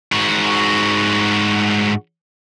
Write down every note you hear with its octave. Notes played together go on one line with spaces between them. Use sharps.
G#2 F#4